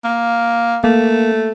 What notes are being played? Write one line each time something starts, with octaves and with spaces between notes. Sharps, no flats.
A#3
A3 A#3